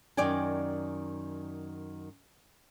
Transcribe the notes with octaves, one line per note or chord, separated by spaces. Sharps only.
F#2 D#3 D5 G5 G#5